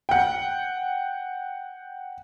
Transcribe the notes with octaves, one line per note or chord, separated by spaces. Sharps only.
F#5 G5